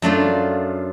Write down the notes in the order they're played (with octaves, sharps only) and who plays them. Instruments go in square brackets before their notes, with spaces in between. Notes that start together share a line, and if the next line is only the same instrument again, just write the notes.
[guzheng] F#2 A3 D4 F4